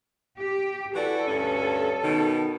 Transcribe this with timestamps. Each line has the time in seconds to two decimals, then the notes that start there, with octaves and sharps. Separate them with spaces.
0.37 G4
0.95 E3 F#4 A4 D5
1.27 D2 G2 C#4
2.03 B2 D#3